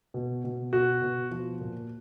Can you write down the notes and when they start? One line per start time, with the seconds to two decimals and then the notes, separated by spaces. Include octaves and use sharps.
0.14 B2
0.44 B2
0.73 B2 F#4
1.02 B2
1.31 F3
1.61 A#2